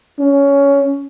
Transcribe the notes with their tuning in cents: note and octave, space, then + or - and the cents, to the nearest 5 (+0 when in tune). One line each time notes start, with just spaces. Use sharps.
C#4 +15